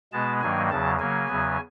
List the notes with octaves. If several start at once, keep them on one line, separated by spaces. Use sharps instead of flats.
B2 G#3 B3 A5
G2 D#3 F#3 A#3 G#5
E2 C#3 F#3 A5
C#3 F#3 A#3 G#5
E2 C#3 F#3 B3